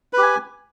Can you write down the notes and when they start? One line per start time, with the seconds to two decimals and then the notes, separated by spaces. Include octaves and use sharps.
0.13 B4
0.18 G4
0.23 G#5